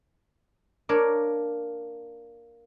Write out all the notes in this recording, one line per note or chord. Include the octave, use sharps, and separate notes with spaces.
A#3 D4 A#4 C#5